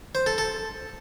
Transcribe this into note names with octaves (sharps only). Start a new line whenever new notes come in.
C5
A4
A4